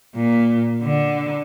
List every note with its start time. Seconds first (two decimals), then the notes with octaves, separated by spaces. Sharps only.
0.15 A#2
0.83 D3